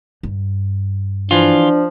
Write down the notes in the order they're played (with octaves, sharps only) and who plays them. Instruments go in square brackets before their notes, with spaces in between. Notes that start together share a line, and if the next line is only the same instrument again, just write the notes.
[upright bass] G2
[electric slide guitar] E3 F4 [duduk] F3 [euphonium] D4